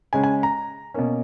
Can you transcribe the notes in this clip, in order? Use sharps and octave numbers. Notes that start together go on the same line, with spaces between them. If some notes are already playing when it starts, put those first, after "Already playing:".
C#3 G#3 C#4 G#5
G#5
A#5
B2 A#3 C#4